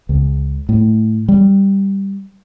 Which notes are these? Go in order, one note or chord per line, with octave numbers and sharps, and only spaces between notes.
C#2
A2
G3